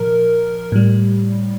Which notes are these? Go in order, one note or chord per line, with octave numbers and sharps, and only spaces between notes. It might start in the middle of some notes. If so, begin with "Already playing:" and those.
Already playing: A#2 F3 A#4
A2 G3